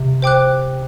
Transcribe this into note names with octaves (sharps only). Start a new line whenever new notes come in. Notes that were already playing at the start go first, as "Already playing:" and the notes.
Already playing: C3
C5 G5 D6 F#6